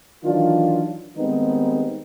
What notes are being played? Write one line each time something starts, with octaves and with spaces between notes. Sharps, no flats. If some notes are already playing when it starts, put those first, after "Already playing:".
D#3 E3 F#3 D4 F4
D#3 G3 G#3 B3 C4 D#4